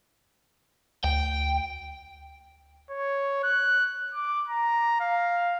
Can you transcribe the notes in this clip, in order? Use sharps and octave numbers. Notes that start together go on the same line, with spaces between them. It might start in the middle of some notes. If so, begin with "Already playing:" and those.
D2 G5
C#5
F#6
D6
A#5
F5